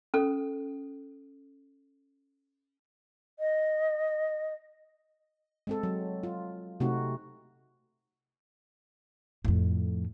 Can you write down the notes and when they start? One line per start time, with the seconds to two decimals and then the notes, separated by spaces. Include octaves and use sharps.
0.14 C#4 A4
3.39 D#5
5.67 G#3 C4 A4
5.83 F#3
6.23 F4
6.80 C3 A3 C4 D#4 F#4
9.45 F2 A2